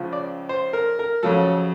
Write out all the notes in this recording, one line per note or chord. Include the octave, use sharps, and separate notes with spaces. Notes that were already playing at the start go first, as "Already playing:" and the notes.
Already playing: C#2 C#3 F3
D5
C5
A#4
A#4
F2 C#3 F#3 A4